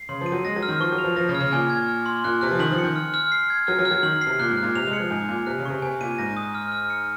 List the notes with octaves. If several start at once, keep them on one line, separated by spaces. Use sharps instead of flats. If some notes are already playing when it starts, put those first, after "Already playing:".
Already playing: C7
C#3 C6
F3 D#7
F#3
G#3 A#6
F#3
F6
D#3
F3 C#6
F#3
F7
F3
F3 A#6
C#3
F6
C#3
A#2 G#5
G#6
F6
C6
A#2 F#6
C3 F#6
F3
D#3 F#7
F3
C#7
D#3
F6
F6
C7
G#6
F#3 F6
F#3
F6
F#3
D#3 F#7
C7
C3
A#2 F#6
G#2
F#6
A#2
C3 F7
G#3
C#7
F3
G#2 G#5
A#2 G#5
C3 F#6
C#3
C3 C#6
C3 G#5
A#2 D#7
G#2 A#6
D#6
F6
F6
C#7